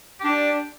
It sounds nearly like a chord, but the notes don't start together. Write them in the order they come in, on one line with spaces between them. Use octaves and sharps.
G4 D4 D5